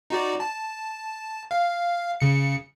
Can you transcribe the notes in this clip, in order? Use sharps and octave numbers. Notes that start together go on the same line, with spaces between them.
D#4 F#4 D5
A5
F5
C#3 C#7